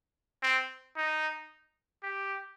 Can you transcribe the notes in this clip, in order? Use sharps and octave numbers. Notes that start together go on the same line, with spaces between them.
C4
D#4
G4